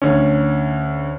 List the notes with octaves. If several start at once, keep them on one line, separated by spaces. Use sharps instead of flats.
D2 C#4